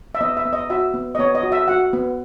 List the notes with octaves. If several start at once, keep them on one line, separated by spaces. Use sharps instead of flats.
E5
B3 D#5
E5
B3
D#5
F#4 E5
B3
D#5
B3 C#5
D#5
F#4
E5
F#4 F#5
B3